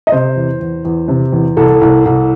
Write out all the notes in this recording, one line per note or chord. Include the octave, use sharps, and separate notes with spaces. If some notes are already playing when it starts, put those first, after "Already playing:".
D#5
C3 C5
E2
E2
E2
C3
E2
C2 A4
C2
C2